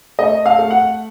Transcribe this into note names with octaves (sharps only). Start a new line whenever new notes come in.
A3 D#5
F5
A3
F#5